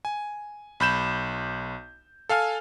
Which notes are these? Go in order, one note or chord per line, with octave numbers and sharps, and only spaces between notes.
G#5
B1 B5 G6 E7
A4 F5 G#5 F6